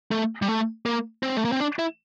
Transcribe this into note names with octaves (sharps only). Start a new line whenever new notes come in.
A3
G3
A3
A#3
C4
A3
A#3
C4
D4
E4